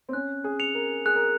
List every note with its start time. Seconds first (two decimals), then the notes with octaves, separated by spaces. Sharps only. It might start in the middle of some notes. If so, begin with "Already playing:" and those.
0.09 C4
0.13 C#4 F#6
0.44 G#4
0.59 C#7 F7
0.75 A#4
1.06 G#4 F#6
1.16 A#4